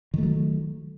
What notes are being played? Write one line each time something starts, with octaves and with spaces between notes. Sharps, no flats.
D#3 F#3 A3